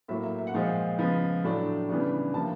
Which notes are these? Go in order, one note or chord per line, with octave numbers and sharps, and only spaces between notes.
A2 F#3 A#3 E5
E5
E5
F#5
A#2 F3 G#3 C4 F5
C#3 F3 G#3 B3
A2 F#3 A3 D4
C#3 E3 G3 B3 D4
C3 F3 A#3 A5